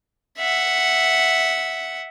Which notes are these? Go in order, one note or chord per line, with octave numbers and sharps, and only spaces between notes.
E5 F#5